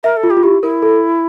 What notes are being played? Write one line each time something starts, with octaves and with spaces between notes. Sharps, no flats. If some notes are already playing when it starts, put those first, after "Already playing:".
A#4 E5
A4
F4
G4
F4
E4 G4
E4 A#4
A4